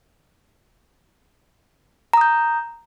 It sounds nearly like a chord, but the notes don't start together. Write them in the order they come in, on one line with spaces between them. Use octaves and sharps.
A#5 D#6 G6